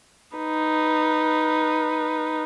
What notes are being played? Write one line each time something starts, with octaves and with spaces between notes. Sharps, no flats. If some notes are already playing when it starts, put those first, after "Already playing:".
D#4 B4